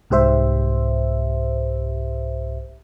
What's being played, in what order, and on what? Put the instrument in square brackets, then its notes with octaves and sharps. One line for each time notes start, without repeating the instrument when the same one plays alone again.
[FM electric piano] C2 G#2 G4 C5 E5